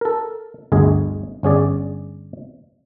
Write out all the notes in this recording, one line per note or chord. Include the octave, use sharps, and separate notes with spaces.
A4 A#4
G1 D2 G#4 D#5
G1 C#4 G#4 D5